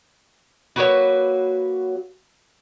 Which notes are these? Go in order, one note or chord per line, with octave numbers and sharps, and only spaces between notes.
F#3 A#3 F#4 B4